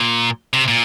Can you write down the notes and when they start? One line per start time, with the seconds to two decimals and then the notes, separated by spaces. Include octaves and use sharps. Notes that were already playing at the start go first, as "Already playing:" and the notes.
Already playing: A#2
0.53 C3
0.68 A#2